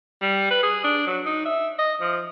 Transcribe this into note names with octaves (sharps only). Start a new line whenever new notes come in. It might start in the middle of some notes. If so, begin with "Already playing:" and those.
G3
B4
G#4
D4
F#3
D#4
E5
D#5
F3